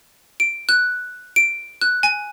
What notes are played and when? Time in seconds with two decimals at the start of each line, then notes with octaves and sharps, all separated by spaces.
0.40 D7
0.69 F#6
1.36 D7
1.81 F#6
2.03 G#5